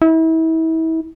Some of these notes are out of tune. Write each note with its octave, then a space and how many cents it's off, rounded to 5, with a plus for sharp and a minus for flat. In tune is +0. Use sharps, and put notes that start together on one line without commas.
E4 -35